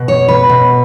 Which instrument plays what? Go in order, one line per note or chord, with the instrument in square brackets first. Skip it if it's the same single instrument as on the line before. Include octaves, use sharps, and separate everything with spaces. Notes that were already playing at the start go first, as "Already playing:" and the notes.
Already playing: [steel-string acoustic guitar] B2
C#5
B4
B2